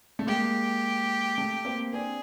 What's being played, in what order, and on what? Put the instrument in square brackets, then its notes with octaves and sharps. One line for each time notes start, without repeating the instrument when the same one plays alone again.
[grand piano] A3
[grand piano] G#3 A#3 [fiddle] G4
[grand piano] A3
A#3 C4
[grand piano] C4 D4 [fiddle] G#4